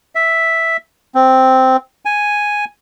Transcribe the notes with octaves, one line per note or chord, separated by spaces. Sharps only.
E5
C4
G#5